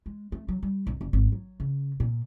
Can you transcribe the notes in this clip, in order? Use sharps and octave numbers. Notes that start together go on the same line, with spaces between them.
G#3
A3
F#3
G3
A#1
F#1
G#1
F#3
C#3
A#2